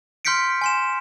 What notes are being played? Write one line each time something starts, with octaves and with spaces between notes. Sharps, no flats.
C6 F6 G6 B6 C#7 D7
G#5 C6 E7